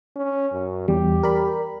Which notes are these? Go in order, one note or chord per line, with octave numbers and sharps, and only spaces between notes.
C#4
F#2
E2 G3 G4
A#4 D5 B5